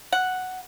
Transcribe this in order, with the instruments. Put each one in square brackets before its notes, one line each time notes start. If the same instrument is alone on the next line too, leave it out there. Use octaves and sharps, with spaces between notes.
[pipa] F#5